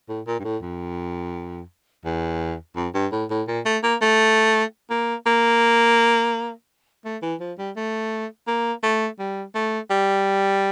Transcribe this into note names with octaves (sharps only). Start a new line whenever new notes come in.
A2
A#2
G2
A2
F2
E2
F2
G2
A2
A2
A#2
A3
A#3
A3
A#3
A#3
A3
E3
F3
G3
A3
A#3
A3
G3
A3
G3